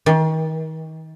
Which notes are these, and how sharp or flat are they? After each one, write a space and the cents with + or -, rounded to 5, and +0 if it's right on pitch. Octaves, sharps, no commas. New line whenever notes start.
D#3 +35